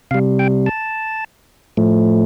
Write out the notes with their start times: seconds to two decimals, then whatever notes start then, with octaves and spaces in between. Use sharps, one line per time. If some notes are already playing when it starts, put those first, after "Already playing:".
0.11 C3 G3 F5
0.39 G5
0.66 A5
1.77 A2 F3 A3